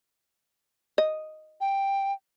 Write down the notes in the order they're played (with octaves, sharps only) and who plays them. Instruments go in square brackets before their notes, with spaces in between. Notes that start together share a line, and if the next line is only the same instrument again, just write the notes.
[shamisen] D#5
[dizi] G5